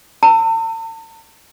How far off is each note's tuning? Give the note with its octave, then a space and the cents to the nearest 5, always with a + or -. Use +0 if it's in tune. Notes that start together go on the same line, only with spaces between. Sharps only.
A5 +45 E6 +0